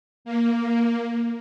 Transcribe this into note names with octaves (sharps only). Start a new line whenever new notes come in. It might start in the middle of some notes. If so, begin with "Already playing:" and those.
A#3